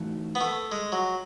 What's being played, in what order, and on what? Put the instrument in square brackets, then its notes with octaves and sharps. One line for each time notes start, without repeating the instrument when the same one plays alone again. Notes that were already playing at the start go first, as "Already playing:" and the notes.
Already playing: [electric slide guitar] E3 A3 D#4 F#4
[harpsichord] B3
A3
G#3
F#3